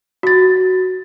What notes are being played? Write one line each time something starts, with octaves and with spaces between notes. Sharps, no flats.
F#4 A6